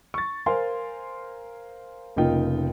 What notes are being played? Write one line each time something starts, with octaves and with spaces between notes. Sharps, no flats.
C#6 A6
A#4 C5 F5 G#5 C6
F1 C#3 A#3 D#4 F4 G5